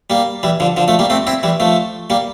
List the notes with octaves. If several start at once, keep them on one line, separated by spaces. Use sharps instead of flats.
G3 A#3
E3 G3
D3 F3
D3 F3
F3 A3
G3 A#3
A3 C4
C4 E4
E3 G3
F3 A3
G3 A#3